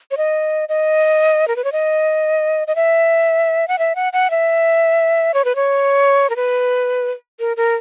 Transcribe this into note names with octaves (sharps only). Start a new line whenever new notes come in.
C#5
D#5
D#5
A#4
B4
C#5
D#5
D#5
E5
F#5
E5
F#5
F#5
E5
C#5
B4
C#5
A#4
B4
A#4
A#4